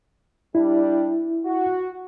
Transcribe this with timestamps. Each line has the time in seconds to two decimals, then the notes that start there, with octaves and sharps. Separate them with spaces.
0.55 G3 D4 E4
1.45 F#4